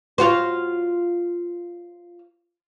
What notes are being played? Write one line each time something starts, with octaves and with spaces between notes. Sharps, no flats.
F4 F#4 C5